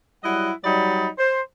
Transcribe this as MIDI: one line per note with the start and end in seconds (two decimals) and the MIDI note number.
0.24 0.51 54
0.24 0.51 55
0.24 0.51 64
0.24 0.51 75
0.24 0.51 78
0.64 1.08 54
0.64 1.08 55
0.64 1.08 63
0.64 1.08 74
0.64 1.08 75
0.64 1.08 83
1.18 1.41 72